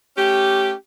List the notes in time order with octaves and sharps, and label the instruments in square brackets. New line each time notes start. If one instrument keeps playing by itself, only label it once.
[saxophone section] A3 C#4 G4